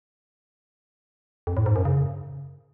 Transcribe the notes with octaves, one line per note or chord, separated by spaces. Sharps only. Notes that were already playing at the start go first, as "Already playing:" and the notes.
F2
A2
G#2
F#2
C#3